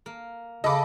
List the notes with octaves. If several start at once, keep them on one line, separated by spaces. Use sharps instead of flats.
A#3
C#3 A4 D#5 B5 D6